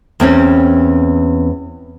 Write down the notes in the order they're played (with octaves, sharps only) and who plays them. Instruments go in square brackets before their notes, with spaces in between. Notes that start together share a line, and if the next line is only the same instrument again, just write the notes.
[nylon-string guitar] E2 C4 C#4